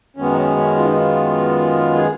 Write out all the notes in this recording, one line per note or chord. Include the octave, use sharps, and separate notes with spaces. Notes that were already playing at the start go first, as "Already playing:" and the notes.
F#2 D#3 G#3 B3 C#4
D#4
C#4
C#4
F4
D#4
F4
G#4